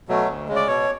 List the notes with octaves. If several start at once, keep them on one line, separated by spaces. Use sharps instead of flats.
B2 F#3 A3
D2
C#3 G#3
D5
B2 C#5